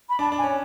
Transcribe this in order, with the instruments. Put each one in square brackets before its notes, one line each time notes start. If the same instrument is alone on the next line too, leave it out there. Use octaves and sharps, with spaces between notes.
[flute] B5
[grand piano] D4 [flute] A5
[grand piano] D4
[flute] G#5
[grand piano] C#4